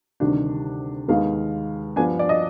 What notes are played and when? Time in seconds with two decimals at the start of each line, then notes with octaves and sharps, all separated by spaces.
0.20 D2 C3 D#3 G3 D4
1.08 D#2 D#3 G#3 B3 F5
1.96 G2 F3 B3 D4 G#5
2.19 D5
2.29 D#5